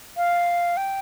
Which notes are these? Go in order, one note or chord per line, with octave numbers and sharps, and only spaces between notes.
F5
G5